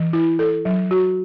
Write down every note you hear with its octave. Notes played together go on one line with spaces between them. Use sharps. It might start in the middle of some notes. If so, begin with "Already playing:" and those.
Already playing: E3
E4
A4
F#3
F#4